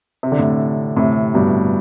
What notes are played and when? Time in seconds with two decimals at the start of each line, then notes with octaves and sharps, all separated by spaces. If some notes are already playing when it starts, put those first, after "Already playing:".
0.23 C3
0.32 D3
0.39 A2 C3
0.97 A2 C3
1.34 G2 B2